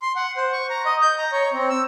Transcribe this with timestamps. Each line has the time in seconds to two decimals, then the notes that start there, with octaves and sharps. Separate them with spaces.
0.02 C6
0.16 F#5
0.37 C5
0.53 C#6
0.70 A#5
0.86 D#5
1.02 G6
1.18 A#5
1.32 C#5
1.53 C4
1.70 E6